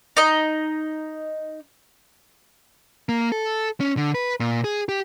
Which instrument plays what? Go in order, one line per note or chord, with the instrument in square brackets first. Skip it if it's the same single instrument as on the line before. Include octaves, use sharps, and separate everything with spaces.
[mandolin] D#4 D#5
[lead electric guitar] A#3
A4
C#4
D3
B4
A#2
G#4
G4